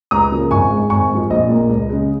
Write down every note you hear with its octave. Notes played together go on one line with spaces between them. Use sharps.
C#2 A#5 D#6
C#3 F3 A#3
G#1 G#5 C#6
G#2 G#3
G#1 G#5 C#6
G#2
F3
A#1 D#5
A#2 A#3
C#2
C#3 G#3